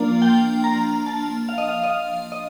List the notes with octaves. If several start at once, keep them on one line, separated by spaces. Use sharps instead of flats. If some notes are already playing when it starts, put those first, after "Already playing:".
Already playing: F3 A#3 D4
G5
A#5
A5
F5
D#5
F5
D#5
F5
D#5